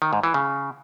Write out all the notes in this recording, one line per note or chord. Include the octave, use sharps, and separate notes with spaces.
D#3
G#2
E3
C#3